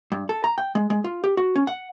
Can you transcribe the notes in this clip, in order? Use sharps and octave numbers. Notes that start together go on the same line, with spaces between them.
G2
A4
A#5
G5
G#3
G#3
F4
G4
F#4
C#4
F#5